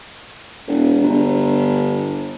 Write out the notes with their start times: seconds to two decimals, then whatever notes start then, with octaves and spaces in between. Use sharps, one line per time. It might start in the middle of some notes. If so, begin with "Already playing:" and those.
0.68 E1
1.02 G1